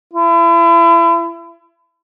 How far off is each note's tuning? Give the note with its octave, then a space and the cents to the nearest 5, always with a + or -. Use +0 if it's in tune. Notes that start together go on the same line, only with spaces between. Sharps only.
E4 +35